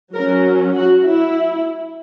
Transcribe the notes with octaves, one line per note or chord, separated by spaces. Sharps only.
F#3 C#4 A#4
F#4
E4